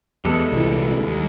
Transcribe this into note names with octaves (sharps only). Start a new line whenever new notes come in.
E2 G3 G#3 A4
C2 A#2 E3
D#2